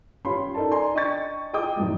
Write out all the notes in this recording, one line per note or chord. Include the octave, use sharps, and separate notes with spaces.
C#4 F4 G4 C#5 B5 C6
D#4 A4 A#4 D5 A5
D5 G#5 A#5 C6
D4 D#5 G5 C#6 A6
G#4 D#5 G5 D6 D#6
F#2 A2 D#3 F3 G3 G#3